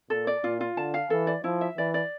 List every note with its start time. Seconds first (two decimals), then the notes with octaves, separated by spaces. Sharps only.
0.10 A#2 A4
0.27 D5
0.44 A#2 F4
0.61 F4
0.77 D3 A5
0.94 F5
1.10 E3 A4
1.27 D5
1.44 F3 E4
1.61 E5
1.78 E3 D5
1.94 D5